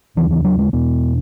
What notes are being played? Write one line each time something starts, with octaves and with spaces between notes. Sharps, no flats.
D#2 C#3 E3
E3
F#3
G#3
E2 B2 B3